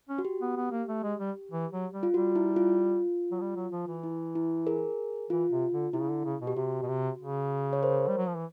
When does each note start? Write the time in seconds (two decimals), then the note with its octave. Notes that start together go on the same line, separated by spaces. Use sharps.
0.09 C#4
0.19 F#4
0.25 G4
0.41 B3
0.57 B3
0.72 A#3
0.88 A3
1.04 G#3
1.20 G3
1.52 E3
1.72 F#3
1.93 G3
2.03 F4
2.14 G3 F#4
2.35 E4
2.56 F4
3.32 F#3
3.41 G3
3.56 F#3
3.72 F3
3.87 E3
4.04 E4
4.35 E4
4.67 G#4 A#4
5.30 E3 F4
5.51 C3
5.72 D3
5.93 C3 E4
6.01 C#3
6.09 D3
6.25 C#3
6.41 B2
6.47 G4
6.56 C3 F#4
6.83 B2
6.88 C3
7.19 C#3
7.73 C#5
7.83 A#4 C5
8.08 G3
8.17 F#3
8.27 F3
8.36 E3